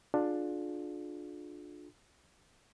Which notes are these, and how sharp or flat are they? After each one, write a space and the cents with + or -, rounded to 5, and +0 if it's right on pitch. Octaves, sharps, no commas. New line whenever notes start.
D4 +10 F4 +20 G#4 +40